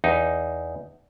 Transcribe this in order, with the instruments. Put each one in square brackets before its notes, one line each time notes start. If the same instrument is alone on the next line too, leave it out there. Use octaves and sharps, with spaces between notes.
[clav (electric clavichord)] E2 D#4